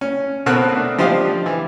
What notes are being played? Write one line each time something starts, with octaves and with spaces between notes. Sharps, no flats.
C#4
B2 C4 F#4 A4 A#4 F#6
A3 D4
F3 D4 G4 C5 D#5 F5
E3